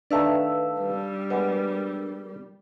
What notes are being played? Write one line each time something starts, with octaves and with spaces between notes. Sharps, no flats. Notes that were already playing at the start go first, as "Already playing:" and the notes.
D#3 A3 D4 B4 D5 F5 A5 E6
G3
G#3 B3 A#4